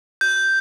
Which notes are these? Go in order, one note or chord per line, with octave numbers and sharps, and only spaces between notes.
G6